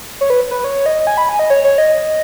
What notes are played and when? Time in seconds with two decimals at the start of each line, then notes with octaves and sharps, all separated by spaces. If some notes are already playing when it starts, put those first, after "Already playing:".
0.21 C#5
0.30 B4
0.51 B4
0.64 C#5
0.86 D#5
1.07 G#5
1.18 B5
1.29 G#5
1.39 D#5
1.50 C#5
1.64 C#5
1.78 D#5